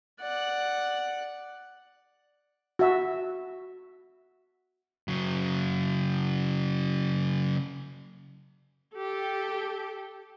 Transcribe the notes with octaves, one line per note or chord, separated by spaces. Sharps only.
D5 F#5
F#4 E5
C#3 F#3
G4 A4